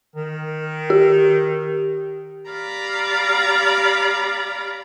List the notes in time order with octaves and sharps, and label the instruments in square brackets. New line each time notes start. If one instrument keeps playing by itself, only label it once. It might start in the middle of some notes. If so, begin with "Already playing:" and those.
[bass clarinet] D#3
[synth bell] G4
[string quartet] G4 D5 F5 A#5 B5